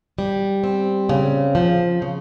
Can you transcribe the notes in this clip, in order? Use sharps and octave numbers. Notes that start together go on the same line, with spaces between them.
G3
C4
C#3
F3
C#3